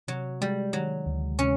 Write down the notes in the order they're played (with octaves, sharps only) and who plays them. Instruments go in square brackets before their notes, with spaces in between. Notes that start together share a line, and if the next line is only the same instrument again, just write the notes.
[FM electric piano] C3 [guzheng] F#3
[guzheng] G3 [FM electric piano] G#3
[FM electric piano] D#3 [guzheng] F#3
[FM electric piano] D2
[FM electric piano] C3 [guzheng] C#4